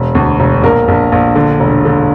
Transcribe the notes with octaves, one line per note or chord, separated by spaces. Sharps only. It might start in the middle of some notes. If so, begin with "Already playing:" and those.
Already playing: E1
D2
E1
A#1 A#4
A#1
A#1
D3
E1
D3